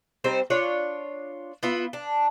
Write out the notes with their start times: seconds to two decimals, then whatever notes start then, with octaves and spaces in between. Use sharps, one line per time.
0.24 G3 C4 D#4 C5
0.50 D4 F4 C#5
1.63 B3 E4 F4
1.93 D4